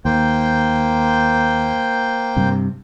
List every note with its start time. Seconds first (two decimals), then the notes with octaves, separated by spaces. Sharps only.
0.05 D#2 A#3 C5 G5
2.37 G2 C3